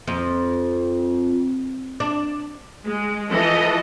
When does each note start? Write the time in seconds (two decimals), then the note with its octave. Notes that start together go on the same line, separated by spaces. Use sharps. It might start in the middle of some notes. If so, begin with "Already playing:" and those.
0.08 F2
2.00 D4
2.84 G#3
3.29 E3 F3 A4 D#5